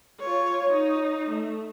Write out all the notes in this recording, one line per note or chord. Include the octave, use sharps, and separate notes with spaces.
F4 C#5
D#4
A3